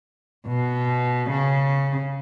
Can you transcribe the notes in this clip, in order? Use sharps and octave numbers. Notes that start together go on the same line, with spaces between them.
B2
C#3